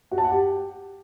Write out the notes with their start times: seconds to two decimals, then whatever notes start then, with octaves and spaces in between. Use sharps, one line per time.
0.11 F#4
0.18 A5
0.24 F#5
0.30 G4